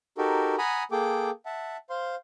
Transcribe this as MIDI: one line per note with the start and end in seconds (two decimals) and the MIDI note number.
0.18 0.55 63
0.18 0.55 66
0.18 0.55 67
0.18 0.55 69
0.18 0.55 70
0.58 0.83 78
0.58 0.83 80
0.58 0.83 82
0.58 0.83 83
0.58 0.83 87
0.91 1.30 58
0.91 1.30 68
0.91 1.30 69
0.91 1.30 79
0.91 1.30 86
1.46 1.77 76
1.46 1.77 78
1.46 1.77 81
1.90 2.15 72
1.90 2.15 77
1.90 2.15 84